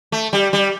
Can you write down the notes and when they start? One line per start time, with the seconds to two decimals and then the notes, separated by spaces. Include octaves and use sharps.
0.12 A3
0.33 G3
0.53 G3